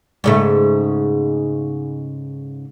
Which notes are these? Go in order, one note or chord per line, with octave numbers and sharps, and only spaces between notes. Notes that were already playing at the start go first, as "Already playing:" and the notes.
G#2 C#3 A3